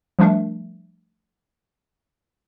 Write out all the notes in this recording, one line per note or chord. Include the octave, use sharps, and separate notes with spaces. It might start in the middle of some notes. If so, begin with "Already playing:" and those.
F3 G3 A3 D4 A#4 E5